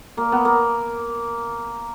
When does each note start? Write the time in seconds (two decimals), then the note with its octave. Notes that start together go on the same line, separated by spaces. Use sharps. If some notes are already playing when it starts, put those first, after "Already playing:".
0.17 A#3
0.32 B3
0.45 A#3